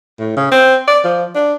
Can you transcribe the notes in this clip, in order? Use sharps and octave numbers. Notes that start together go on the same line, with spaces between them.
A2
C#3
C4
D5
F3
D4